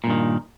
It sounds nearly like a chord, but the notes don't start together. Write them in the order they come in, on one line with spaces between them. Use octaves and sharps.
A#2 G2 D#3